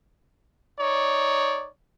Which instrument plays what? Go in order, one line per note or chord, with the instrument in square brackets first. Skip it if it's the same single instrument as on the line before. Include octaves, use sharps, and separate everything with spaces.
[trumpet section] D#4 C#5 D5